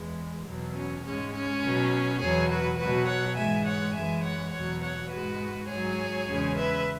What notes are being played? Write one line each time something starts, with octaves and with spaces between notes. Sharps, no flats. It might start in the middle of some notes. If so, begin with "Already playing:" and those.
Already playing: E2 E3 G#3
E2 B2 F#3
C#4
G#2 G#3 C#4
C#4
B2 F#3
E2 B2 F#3 G#4 C#5
F#4 B4
B2 F#3 F#4 B4
C#5 F#5
G#2 E3 G#3 E5 G#5
C#5 F#5
F#2 E3 G#3 E5 G#5
C#5 F#5
E2 B2 F#3 C#5 F#5
C#5 F#5
G#2 G#3 F#4 B4
G#2 F#3 G#4 C#5
E2 C#3 G#3
B4 E5